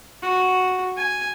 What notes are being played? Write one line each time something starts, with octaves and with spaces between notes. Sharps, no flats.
F#4
G#5